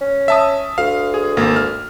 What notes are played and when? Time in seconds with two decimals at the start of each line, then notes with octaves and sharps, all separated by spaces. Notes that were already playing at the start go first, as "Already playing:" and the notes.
0.01 C#4
0.28 E5 A5 D#6
0.78 D2 F5
1.14 G#4
1.37 G#1 A#3
1.56 F6